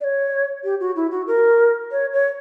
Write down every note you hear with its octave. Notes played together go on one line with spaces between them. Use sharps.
D5
C#5
G4
F#4
E4
F#4
A#4
C#5
C#5